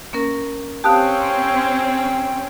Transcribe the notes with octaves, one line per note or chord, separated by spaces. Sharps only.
A#3 C#4 A#4
C4 C#4 G4 F5 G5 A5 D#6 F#6